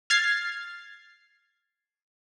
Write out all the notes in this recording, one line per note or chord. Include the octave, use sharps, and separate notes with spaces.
F6 G#6 A6 C7